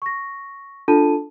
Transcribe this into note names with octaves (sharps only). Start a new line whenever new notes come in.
C#6 A#6
D4 F4 A4 A5 D#7